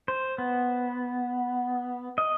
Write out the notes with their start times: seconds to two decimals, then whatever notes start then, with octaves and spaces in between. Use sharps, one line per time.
0.08 C5
0.38 B3
2.18 D#5